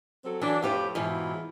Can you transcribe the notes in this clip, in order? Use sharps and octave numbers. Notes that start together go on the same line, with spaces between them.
F#3 C4 A4
E3 F#3 D4 A4
F2 A2 F3 A3 G4 B4
G#2 B2 E3 F#3 E4 F4